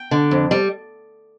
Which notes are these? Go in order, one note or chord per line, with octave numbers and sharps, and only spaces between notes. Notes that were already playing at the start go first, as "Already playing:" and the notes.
Already playing: G5
D3
F2
G3